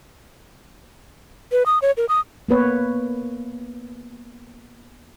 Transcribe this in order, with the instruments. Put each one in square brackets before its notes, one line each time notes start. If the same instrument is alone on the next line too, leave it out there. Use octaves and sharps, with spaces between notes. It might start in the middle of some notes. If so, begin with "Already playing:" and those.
[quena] B4
D#6
C#5
A#4
D#6
[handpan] A#3 B3 B4 C#5